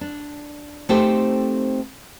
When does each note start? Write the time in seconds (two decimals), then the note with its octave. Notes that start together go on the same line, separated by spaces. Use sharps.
0.01 D4
0.89 A3 C4 D#4 G4 A4 C5